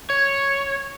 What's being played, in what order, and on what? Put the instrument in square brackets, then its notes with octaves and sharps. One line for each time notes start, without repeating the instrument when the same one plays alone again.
[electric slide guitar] C#5